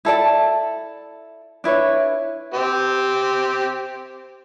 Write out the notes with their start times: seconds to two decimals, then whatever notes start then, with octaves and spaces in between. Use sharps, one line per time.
0.05 E4 A4 D5 A5
1.64 D4 E4 B4 C#5
2.54 C4 G4